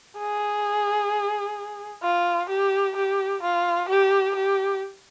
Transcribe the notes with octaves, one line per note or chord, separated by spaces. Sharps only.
G#4
F4
G4
G4
F4
G4
G4